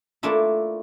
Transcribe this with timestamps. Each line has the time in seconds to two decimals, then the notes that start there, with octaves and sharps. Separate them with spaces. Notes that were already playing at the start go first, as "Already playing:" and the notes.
0.23 A3 A#3 D4 E4 F4